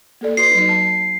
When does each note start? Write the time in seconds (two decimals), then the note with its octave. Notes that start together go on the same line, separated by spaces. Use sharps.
0.21 A#3 A4 D5
0.37 F#4 B4 C6 C7
0.50 F#3 D#4
0.69 A5